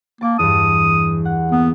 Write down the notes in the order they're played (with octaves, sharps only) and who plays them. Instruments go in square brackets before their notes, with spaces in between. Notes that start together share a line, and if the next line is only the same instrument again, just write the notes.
[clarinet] A#3 [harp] A5 D6
[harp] E2 G2 [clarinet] D#6
[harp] F#5
[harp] A#3 [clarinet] B3